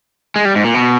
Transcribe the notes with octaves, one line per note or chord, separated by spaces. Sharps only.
G#3
G3
G#2
A#2
B2